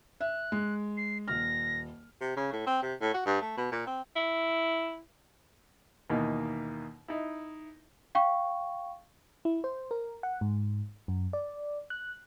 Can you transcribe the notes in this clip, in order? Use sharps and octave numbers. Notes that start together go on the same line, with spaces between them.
E5 F#6
G#3
C7
D#1 F6 A#6
C3
C#3
A2
C4
C3
A2
F#4
G2
A3
B2
A#2
C4
E4
D#2 B2 E3 A#3 D#4
D#4 E4
F5 G5 C#6
E4
C5
A#4
F#5
G#2
F#2
D5
F#6